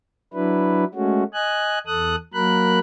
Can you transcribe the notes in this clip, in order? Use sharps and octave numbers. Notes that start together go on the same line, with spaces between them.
F#3 D4 E4 B4
G#3 A3 C#4 F#4
D#5 G#5 F#6
E2 A4 D#6 F#6
F#3 A#3 A#4 B5 F#6